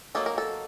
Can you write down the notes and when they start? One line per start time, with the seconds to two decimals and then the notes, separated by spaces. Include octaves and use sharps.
0.15 F#3 A#3 D#4 A4
0.26 A#4
0.38 A4